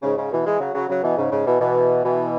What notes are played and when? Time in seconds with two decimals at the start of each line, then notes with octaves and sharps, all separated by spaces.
0.02 G#2 C#3
0.17 G#2 C#3
0.32 B2 E3
0.46 E3 G#3
0.60 C#3 F#3
0.74 C#3 F#3
0.89 C#3 F#3
1.03 B2 E3
1.17 G#2 C#3
1.31 G#2 C#3
1.46 B2 E3
1.60 B2 E3
2.04 B2 E3